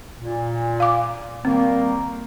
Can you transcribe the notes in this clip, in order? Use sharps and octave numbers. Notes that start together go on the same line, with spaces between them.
A#2
F5 D6
D#3 G3 A#3 C4